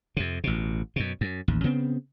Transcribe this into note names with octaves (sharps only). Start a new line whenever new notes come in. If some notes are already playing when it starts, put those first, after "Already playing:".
F2 C3
A1 B2
F#2 B2
F#2
A1 D#2
C#3 B3 C4